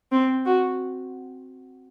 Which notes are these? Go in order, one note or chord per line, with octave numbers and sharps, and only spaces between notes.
C4
F#4